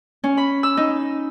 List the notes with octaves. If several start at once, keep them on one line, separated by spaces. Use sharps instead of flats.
C#4
B5
E6
D#4